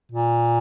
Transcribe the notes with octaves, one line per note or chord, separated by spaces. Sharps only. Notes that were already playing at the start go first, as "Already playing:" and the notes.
A#2